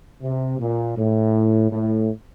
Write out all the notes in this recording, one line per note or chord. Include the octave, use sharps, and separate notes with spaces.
C3
A#2
A2
A2